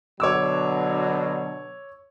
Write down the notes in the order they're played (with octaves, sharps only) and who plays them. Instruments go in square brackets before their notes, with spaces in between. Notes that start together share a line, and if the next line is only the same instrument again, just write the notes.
[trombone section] B2 D3 F#3 [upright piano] C#5 D6 E6